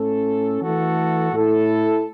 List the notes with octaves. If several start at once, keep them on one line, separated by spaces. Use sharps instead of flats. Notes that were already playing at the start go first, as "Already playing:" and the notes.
Already playing: A2 A3 C#4 A4
E3 A3 F#4 A4
A2 A3 E4 A4